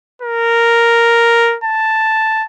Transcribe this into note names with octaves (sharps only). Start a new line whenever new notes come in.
A#4
A5